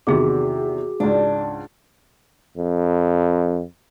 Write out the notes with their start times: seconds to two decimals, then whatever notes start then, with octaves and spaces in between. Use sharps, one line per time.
0.07 E2 C3 D#3 F#4 G#4 D6
1.00 C#2 G#2 D4
2.57 F2